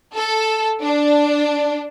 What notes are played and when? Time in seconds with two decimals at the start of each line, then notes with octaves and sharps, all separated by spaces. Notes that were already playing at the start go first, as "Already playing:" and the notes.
0.15 A4
0.82 D4